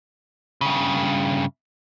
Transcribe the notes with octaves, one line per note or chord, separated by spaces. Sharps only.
G2 C#3